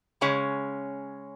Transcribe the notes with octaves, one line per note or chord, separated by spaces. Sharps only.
C#3 G#3 C#4